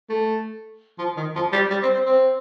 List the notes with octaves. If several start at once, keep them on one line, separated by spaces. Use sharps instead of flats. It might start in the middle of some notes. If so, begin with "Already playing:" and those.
A3
F3
D#3
F3
G3
G3
C4
C4
C4